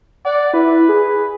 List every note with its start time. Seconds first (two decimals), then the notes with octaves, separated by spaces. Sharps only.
0.25 D5 F#5
0.54 E4 B4
0.89 G#4